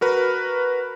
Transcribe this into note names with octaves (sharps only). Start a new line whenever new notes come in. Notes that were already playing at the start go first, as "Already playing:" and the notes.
F#4 A#4 B4